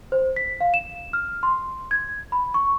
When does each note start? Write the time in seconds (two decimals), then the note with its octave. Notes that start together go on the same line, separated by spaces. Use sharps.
0.12 C5
0.36 B6
0.61 F5
0.74 E7
1.13 F6
1.43 C6
1.91 G#6
2.32 B5
2.54 C#6